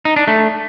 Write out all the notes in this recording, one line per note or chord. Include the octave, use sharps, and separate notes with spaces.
D#4
D4
A3